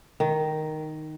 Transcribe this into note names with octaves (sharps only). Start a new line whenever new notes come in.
D#3